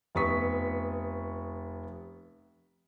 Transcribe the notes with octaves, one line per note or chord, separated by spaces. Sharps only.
F1 B3 C#6 D#6 B6